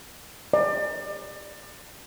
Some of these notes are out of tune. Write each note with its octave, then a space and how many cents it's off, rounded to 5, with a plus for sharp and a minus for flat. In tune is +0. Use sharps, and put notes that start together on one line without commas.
D5 +30